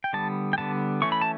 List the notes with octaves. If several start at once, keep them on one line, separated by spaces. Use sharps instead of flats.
G5
D3 G3 B3 A5
G5
D3 G3 B3 A5
E3 A3 C#4 C#6
B5
A5